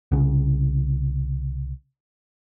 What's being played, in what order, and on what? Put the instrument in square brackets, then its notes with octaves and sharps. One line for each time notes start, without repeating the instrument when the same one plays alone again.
[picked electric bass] C2 C#3